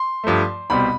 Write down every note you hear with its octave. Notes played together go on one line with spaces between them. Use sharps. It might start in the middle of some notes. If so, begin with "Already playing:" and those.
Already playing: C6
G2 F3 A3
C2 B2 G3 C4 B5